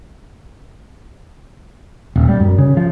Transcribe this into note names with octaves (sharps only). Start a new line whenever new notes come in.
D#1
G3
F#2
C#3
F3